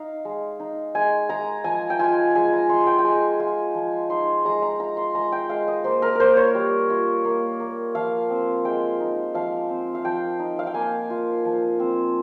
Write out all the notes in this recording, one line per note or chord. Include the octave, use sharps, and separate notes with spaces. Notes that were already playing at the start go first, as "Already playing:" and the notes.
Already playing: D#4 F5
G#3
D#4
G#3 G#5
G#3 A#5
F3 G#5
G5
F4 G#5
G#3 G#5
A#5
G#3 C6
G5
G5
G#3 G#5
F4 G#5
F3
D#4 C6
G#3 A#5
A#5
F4 A#5
C6
G#3 A#5
G5
G#3 F5
D#5
A#3 C5
A#4
A#3 A#4 C5
C#5
G3
F4
A#3
A#3
F3 F5
C4
G#3 G5
D#4
F3 F5
C4
F5
F3 G5
D#4
F5
G5
A#3 G#5
F4
F3
C4